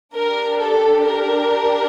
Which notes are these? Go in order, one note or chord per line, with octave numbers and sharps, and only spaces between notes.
D4 G4 A#4
A4
A#4